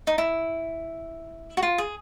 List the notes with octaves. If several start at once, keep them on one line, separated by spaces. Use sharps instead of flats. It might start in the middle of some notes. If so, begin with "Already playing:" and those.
D#4
E4
F#4
F4
G#4